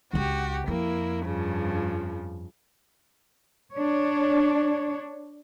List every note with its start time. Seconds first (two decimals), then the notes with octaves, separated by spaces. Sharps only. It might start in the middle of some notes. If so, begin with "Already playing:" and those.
0.13 C#2 D4 F#4 G4
0.68 F2 A#3 E4
1.25 G2 C#3 F3
3.74 D4 C#5